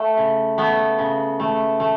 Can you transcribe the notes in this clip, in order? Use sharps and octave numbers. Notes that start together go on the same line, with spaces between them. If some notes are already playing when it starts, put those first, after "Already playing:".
Already playing: A3
C#3
A3 B3
C#3
A3
A3